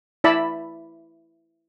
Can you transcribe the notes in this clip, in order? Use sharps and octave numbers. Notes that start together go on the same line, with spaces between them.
E4 D5 A5 B5 E6